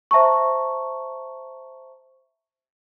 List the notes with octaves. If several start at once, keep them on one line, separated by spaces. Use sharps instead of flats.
C5 E5 A5 A#5 C#6